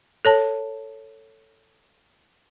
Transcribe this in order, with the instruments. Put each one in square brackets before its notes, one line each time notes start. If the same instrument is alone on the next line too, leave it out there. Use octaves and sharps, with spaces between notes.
[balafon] A4 C#5 A5